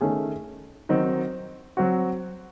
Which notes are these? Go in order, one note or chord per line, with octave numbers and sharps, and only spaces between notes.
D#3 A3 C#4 G#4
D#3 F#3 C4 D#4
F#3 C4 F#4